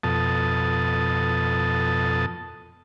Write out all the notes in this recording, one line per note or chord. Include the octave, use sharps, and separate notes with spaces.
F2 B2 A4 A5 D#6